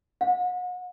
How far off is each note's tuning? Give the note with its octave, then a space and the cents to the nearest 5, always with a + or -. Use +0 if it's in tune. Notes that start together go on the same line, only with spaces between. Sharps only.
F#5 -40